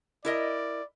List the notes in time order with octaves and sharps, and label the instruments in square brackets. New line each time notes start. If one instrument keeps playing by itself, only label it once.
[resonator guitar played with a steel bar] E4 A#4 D#5 [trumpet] D5